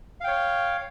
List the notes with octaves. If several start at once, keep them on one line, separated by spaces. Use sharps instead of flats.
C#5 F5 G5